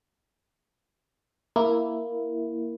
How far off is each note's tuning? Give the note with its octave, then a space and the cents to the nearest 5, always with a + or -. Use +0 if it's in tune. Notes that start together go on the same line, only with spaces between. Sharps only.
A#3 +0 E4 +0